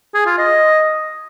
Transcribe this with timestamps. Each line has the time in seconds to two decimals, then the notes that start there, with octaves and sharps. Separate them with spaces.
0.14 G#4
0.26 F4
0.38 D#5